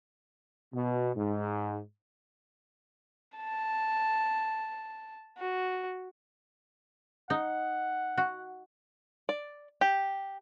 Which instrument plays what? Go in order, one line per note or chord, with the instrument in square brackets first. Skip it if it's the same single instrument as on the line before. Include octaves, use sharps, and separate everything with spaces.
[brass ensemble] B2
G#2
[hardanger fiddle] A5
F#4
[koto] D#4 [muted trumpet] F#5
[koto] F#4
[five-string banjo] D5
G4